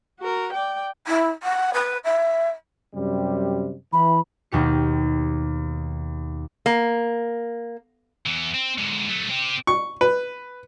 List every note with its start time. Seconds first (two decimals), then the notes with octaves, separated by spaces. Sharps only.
0.19 F#4 A#4
0.53 D5 G5
1.07 E4
1.42 F#5
1.73 B4
2.04 E5
2.94 F#2 C3 G3
3.93 E3 B5
4.52 D#2 B2 G4 C#7
6.66 A#3
8.26 E2 E3
8.54 C4
8.78 G#2 D3
9.09 F#3 A3
9.30 C4 G4
9.67 C#6
10.01 B4